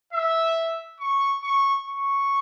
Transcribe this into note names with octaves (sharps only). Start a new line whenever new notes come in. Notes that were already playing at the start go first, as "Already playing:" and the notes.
E5
C#6
C#6
C#6